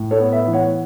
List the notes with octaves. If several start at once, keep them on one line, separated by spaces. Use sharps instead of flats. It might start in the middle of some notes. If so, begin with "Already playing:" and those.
Already playing: A2
A4 C#5
B3
B4 E5
E3
C#5 F#5